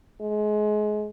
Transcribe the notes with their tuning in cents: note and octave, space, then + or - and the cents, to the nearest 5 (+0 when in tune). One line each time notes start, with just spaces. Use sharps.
G#3 +25